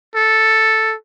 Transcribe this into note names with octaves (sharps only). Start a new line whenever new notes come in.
A4